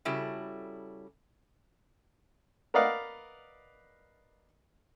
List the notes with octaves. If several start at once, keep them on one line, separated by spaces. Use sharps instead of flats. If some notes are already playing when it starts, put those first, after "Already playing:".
C#3 G3 E4 F#4 A4
A#4 B4 D5 D#5 F5 F#5